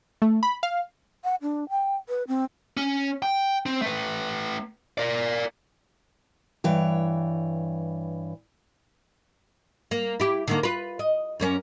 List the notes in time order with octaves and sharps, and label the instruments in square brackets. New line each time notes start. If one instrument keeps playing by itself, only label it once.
[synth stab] A3
B5
F5
[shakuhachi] F#5
D4
G5
B4
C4
[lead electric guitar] C#4
G5
C4
A3 B4
A#4 D5
[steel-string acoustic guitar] G2 E3 C#5 G5
[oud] A#3
E4 G4
D3 D#3 A#3
F4 B4
D#5
F#2 A#3 C#4